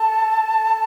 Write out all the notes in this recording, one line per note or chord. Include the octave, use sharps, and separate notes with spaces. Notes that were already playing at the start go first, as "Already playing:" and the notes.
Already playing: A4 A5